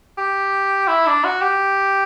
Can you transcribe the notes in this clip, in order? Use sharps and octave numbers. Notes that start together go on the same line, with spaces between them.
G4
E4
D4
F#4
G4